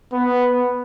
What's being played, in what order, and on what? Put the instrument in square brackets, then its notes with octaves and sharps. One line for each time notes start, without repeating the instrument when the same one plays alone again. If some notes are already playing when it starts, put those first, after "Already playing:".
[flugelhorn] B3